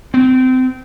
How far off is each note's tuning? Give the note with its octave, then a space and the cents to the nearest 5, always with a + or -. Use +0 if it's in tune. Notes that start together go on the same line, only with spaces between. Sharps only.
C4 -30